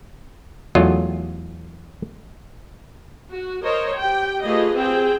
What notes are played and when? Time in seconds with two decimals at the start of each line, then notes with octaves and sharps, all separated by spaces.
0.75 E2 F#3 A3 F4 D#5
3.31 F#4
3.63 A#4 C5 C#5 D#5
3.97 G4 G5
4.43 A3 F4 G4 G#4 B4 D#5
4.76 C4 G#4 G5